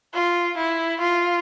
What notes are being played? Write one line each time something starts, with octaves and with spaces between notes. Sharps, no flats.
F4
E4
F4